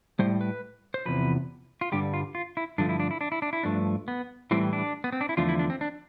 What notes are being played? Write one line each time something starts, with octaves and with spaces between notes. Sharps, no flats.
A2 G3 C5
B4
C5
E2 C3 F3 B4
F4
G2 D3 G3 G4
F4
F4
E4
G2 D3 F3 A3 D4
E4
D4
E4
D4
E4
D4
E4
G2 F3 A3 D4
B3
A2 E3 G3 C4
D4
B3
C4
D4
E4
E2 D3 F3 A3 F4
E4
D4
C4
D4